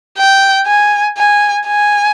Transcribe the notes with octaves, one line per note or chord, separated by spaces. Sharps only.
G5
G#5
G#5
G#5